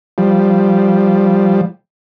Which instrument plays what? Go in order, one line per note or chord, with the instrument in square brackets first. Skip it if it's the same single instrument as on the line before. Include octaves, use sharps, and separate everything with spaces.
[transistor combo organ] F3 G3